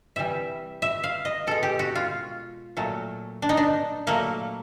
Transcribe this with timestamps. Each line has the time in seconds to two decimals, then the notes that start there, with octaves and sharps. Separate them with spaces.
0.16 C3 E3 G3 E5
0.82 E5
1.04 F5
1.25 D#5
1.47 B2 G#3 A4
1.63 G4
1.79 F#4
1.95 F4
2.77 A#2 F#3 A3
3.42 D4
3.49 D#4
3.57 D4
4.07 A#2 F#3 A3 A#3